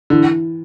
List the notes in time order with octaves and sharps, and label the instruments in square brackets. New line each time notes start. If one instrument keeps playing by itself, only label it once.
[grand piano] D3 [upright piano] E3